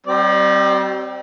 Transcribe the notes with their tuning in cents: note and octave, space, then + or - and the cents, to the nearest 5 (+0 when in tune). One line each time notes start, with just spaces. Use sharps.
G3 -40 C4 +0 D5 +35